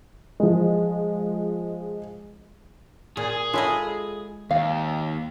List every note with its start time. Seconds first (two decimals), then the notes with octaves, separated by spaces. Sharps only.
0.40 F3 G#3
3.17 A#2 G#4
3.30 G#4
3.53 G#3 E4 F4 A4 C#5 D#5
4.51 D#2 F5